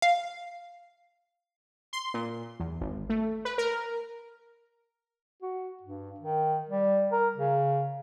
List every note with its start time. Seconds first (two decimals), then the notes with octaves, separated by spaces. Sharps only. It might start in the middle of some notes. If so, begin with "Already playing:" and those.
0.02 F5
1.93 C6
2.14 A#2
2.60 E2
2.81 G#1
3.09 A3
3.45 B4
3.58 A#4
5.42 F#4
5.83 G2
6.20 D#3
6.69 G3
7.12 A#4
7.37 C#3